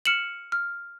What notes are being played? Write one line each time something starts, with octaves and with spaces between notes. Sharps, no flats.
F6 C#7 E7 F#7
F6